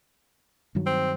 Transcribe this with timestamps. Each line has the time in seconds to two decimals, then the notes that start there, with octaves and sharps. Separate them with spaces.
0.75 G2 D#3 F#3
0.86 C4